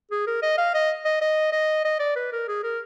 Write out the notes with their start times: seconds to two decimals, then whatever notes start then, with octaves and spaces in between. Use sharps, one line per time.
0.11 G#4
0.27 A#4
0.42 D#5
0.57 F5
0.74 D#5
1.05 D#5
1.21 D#5
1.52 D#5
1.85 D#5
1.99 D5
2.16 B4
2.32 A#4
2.48 G#4
2.63 A#4